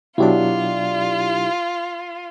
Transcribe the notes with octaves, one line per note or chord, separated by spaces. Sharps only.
B2 F#3 D4 E4 F4 G4 D5